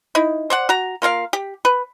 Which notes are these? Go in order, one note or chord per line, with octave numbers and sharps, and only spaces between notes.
D#4 E4
C5 D5 F#5
F#4 A#5
A#3 F4 A#4 F5
G4
B4